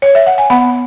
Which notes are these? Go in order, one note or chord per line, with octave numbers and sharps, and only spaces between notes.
C#5
E5
F#5
G#5
B3 F#5 B5